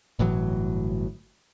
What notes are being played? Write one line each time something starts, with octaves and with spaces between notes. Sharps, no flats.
G1 A2 E3 F#3